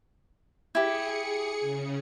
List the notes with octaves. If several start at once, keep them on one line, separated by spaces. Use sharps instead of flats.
E4 G4 G#4 C#7
C#3